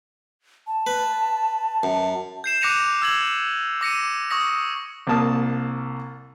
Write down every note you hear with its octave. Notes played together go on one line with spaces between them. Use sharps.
A5
B4
F#2
G6 C7 E7
D6 F#6 A#6 C#7 D#7 F7
E6 G#6 F#7
D6 A#6 C#7 D#7
C#6 D#6 A#6
C2 A#3 A5 D#6